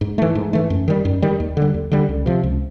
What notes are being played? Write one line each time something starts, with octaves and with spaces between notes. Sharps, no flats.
G#2
E3 A3
G#2
E3 A3
F#2
D#3 G3
F#2
D#3 G3
D#2
D3 G3
D#2
D3 G3
C#2
C3 F3
C#2